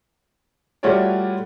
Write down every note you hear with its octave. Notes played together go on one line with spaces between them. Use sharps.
G3 A3 F4 F#4 C#5 D5